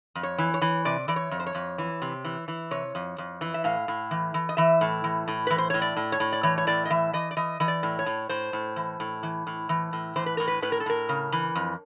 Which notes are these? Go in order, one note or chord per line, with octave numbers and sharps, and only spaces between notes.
F2
C#5
E3
C#5
E3
C3 D5
E3 D5
C#5
F2
C5
C#5
F2
E3
C3
E3
E3
C3 C#5
F2
F2
E3
E5
A2 F5
A2
E3
E3
D#5
E3 E5
A2
E3
A2
E3 B4
C5
A2 C#5
D5
A2
C#5
A2
D5
E3 C#5
C#5
A2 D5
D#5
E3 E5
E3 D#5
D5
E3 D#5
E3 D#5
D5
A2
C#5
A2
A2 C5
A2
E3
A2
E3
A2
E3
A2
E3 C5
B4
A2 A#4
B4
A2 B4
A#4
A4
A2 A#4
C#3
E3
F2